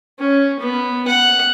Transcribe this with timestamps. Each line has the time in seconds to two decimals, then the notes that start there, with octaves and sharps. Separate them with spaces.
0.19 C#4
0.60 B3
1.08 F#5